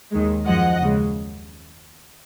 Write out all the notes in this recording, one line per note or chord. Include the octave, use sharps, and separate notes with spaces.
D#2 D#3 G#3
F#2 F3 G#3 D#5 F#5
D#2 C#3 G#3